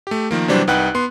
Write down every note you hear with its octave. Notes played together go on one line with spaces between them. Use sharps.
A3 G4
D#3 F3 A#3
C3 E3 F#3 G3 D4 C5
C2 D#4 B4 F#5 G5 F#6
B3 C6